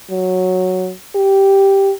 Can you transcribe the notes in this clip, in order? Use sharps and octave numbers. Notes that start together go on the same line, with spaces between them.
F#3
G4